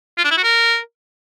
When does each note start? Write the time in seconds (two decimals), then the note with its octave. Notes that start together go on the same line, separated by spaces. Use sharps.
0.18 F4
0.24 D4
0.31 E4
0.37 F#4
0.44 A#4